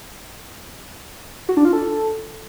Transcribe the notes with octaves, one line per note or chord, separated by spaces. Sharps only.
F#4
D4
F4
A4